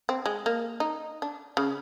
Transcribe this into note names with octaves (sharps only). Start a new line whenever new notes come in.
C4
G#3
A#3
D#4
D4
C#3